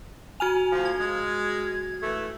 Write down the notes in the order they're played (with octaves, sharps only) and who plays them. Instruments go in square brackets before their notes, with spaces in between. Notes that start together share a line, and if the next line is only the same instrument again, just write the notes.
[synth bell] F#4 F6 F7 [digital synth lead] G#5
[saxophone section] D2 F3
[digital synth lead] G#6
[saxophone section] G#3
E3 A3